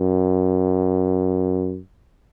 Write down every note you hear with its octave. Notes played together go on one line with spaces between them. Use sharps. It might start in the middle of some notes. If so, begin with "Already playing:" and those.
Already playing: F#2